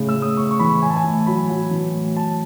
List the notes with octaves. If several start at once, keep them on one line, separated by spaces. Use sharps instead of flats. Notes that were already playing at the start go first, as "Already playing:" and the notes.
Already playing: A2 C#3
E6
A2
D#6
A2 C#6
C#6
E3 B5
A2 G#5
A5
G#5
A2 A5
F#3 B5
F#3
E3
A2
A2 A5